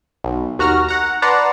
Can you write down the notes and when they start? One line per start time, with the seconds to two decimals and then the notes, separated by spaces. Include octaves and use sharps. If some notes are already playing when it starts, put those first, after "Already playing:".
0.24 B1
0.59 D#2 F#4 A#5 F6
0.89 F#5 A#5
1.22 B4 D5 F#5 A5 A#5 C6